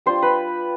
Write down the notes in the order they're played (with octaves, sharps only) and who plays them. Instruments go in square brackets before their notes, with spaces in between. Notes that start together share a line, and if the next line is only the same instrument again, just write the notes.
[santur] G3 D4 F4 C5 C6
B4 B5